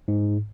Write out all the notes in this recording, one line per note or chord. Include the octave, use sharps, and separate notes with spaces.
G#2